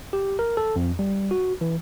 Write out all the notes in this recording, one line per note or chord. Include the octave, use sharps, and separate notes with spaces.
G4
A#4
A4
F2
G3
F#4
E3